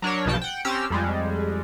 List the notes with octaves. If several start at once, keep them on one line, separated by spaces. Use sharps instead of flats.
F#3 D4 A#4 C#5
B1 G2 B2 F3 G5 A5
F#5 G5
C4 C#4 G4 A#5 E6 F6
F2 G3 G#3